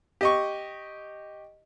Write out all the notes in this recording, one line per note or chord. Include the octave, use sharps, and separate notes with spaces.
G4 D#5 C#6